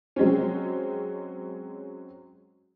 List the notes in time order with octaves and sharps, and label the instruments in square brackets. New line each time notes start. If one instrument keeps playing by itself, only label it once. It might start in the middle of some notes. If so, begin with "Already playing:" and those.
[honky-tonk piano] F#3 G#3 C4 C#4